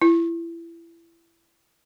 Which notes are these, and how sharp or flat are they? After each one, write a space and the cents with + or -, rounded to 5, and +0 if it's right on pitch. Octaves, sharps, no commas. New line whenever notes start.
E4 +25